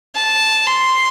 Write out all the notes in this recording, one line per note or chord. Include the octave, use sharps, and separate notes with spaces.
A5
C6